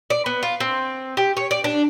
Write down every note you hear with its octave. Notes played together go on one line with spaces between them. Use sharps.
D5
B3
F4
C4
G4
C#5
D5
D4